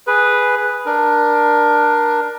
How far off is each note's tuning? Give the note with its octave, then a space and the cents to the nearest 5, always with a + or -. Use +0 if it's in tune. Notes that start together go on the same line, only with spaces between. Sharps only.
G#4 +0 B4 +0
D4 +15 A#4 +20